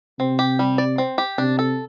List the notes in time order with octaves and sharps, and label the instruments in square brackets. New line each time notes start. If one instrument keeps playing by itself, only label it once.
[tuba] C3 [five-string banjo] C4
[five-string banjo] G4
G3
D5
C4
G4
[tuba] C3 [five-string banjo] D4
[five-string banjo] A4